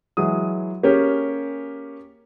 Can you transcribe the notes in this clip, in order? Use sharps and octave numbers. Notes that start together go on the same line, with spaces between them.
E3 F#3 G#3 D#6
A#3 C#4 G4 G#4 C#5